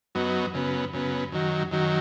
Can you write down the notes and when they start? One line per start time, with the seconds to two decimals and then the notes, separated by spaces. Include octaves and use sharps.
0.15 F#2 F#3 B3 D#4
0.54 F#2 C#3 B3
0.93 F#2 C#3 B3
1.32 F#2 D#3 F#3
1.71 F#2 D#3 F#3